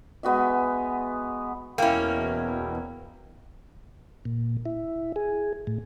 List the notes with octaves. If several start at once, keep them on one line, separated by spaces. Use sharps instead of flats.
G#3 B3 F#4 E5
E2 B2 A#3 C#4 E4 G5
A#2
E4
G#4
A2